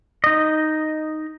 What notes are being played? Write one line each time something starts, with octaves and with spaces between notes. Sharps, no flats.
D#4 D#5